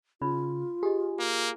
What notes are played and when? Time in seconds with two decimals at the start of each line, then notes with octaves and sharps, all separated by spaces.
0.22 C#3 D#4 F4 B5
0.83 G4 G#4 D#5
1.19 A#3